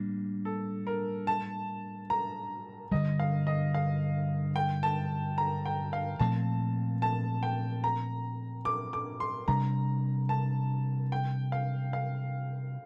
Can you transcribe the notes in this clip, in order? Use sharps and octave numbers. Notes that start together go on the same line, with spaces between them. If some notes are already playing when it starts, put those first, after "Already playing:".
Already playing: A2 G3 A#3 D4
A4
A#4
A5
A#5
G2 D3 G3 D#5
F5
D#5
F5
G5
A5
A#5
G5
F5
A#2 F3 A3 C4 A5
A5
G5
A#5
D6
D6
C6
C3 G3 D4 A#5
A5
G5
F5
F5